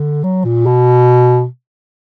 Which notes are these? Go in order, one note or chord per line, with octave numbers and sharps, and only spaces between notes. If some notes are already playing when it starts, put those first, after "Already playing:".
Already playing: D3
F#3
A#2
B2